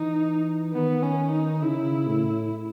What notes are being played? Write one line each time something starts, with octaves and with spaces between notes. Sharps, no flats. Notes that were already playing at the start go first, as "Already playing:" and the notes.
Already playing: E3 D#4
D#3 B3
C#4
D#4
C#3 E4
A2